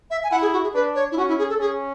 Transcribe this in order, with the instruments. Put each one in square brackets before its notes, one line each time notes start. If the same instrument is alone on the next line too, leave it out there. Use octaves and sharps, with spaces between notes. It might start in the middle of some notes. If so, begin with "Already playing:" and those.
[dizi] E5
G#5
[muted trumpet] E4 [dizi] F#5
[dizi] G#4
F#4
G#4
[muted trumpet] D4 [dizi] B4
[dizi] C#5
E4
[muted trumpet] C#4 [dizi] F#4
[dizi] E4
G#4
A4
[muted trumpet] C#4 [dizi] G#4